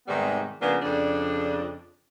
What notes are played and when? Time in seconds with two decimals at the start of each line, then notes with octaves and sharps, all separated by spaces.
0.07 G#2 C3 D#3 G3 B3
0.60 C#3 F3 A#3 B3 D4
0.82 F2 C#3 D4